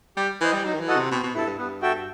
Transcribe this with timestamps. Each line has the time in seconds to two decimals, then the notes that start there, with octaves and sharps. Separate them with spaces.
0.17 G3 G4
0.41 E3 C5 D#5
0.53 G3
0.64 F#3 D#4
0.74 D#3
0.80 E3
0.88 F#4 A4 D#5 F#5
0.96 C3
1.11 B2 C4
1.23 B2
1.35 G2 E4 A4
1.46 G2
1.58 G2 B3
1.82 F#4 A4 E5 G5